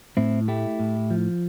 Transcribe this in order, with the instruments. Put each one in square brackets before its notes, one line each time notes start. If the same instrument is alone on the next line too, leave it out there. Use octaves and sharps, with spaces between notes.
[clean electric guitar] A2 C4 E4
A3 E4 G4
A2
F3